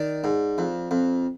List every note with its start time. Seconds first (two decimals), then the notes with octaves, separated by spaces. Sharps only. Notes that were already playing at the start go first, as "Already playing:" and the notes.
Already playing: D#3 D5
0.24 G#2
0.58 F2
0.91 F2